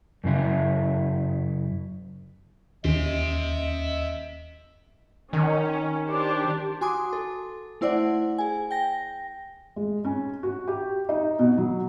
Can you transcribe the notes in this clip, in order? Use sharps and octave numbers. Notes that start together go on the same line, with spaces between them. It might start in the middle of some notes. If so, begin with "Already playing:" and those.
F#2 C#3 E4
D#2 C#4 D#5 E5 C6
D#3 C#4
D4 G4 C5
F#4 G#5 C6 D6 D#6
A4
A3 E4 C5 D5 F#5
G#4 G#5
G5 A#6
G#3
C#4
F#4
G4
D#4
B2
F#3